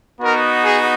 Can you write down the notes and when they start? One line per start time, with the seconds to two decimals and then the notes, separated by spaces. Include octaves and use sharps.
0.21 B3 D#4 F#4 A#4
0.65 G#4